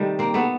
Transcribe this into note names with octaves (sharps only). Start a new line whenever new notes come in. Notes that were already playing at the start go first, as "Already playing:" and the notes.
Already playing: C3 D#3 G3 A3
A#3 C4
A3 B3